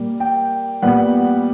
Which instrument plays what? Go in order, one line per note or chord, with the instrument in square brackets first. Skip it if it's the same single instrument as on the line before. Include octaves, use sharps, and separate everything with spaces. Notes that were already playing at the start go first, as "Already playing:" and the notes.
Already playing: [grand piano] A#2 G3 A#3
G5
A#2 G3 B3 F#5